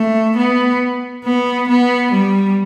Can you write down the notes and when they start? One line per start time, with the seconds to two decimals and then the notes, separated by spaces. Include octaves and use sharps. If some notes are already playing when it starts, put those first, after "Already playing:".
Already playing: A3
0.37 B3
1.24 B3
1.69 B3
2.12 G3